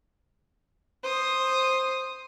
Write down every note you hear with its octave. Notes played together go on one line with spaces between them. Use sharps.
C5 D#6